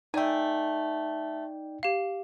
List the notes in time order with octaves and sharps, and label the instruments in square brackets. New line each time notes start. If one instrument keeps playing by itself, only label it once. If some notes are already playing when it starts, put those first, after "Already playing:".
[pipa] A3 G#5 [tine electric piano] D#4 D5 G5
[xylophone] G4 F5